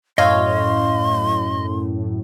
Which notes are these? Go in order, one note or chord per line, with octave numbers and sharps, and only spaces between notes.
F#2 A2 C#5 D#5 F5 C6